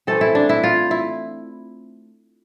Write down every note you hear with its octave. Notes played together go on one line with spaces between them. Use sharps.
E3 A3 C4 A4
E4
D4
E4
F4
E4